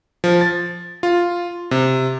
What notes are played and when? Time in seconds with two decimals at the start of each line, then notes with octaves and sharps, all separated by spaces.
0.24 F3
0.41 A6
1.03 F4
1.71 C3